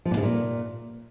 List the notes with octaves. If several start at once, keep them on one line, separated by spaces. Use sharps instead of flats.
F3
A#2
C#3
A#2